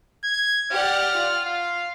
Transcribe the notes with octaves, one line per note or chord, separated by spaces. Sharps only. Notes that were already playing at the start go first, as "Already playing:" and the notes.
G#6
G4 D5 F#5 F6
F4
F5